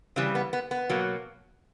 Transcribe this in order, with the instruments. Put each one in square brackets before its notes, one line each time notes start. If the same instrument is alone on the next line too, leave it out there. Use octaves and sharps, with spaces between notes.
[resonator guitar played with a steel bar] C#3 E3 G3 C4
B3
B3
B3
B2 F#3 A#3